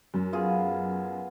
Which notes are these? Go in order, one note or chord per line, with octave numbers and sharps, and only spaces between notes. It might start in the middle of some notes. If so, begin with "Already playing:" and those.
F#2
B3 F4 G#4